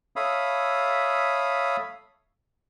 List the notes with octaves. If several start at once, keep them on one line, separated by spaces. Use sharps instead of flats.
A4 C#5 E5 F5 B5 D#6